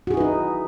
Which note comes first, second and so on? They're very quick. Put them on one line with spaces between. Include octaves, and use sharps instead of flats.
F#4 G#4 E4 B4 D#4